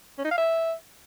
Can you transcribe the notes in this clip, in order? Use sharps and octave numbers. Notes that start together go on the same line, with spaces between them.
C#4
D#4
F5
E5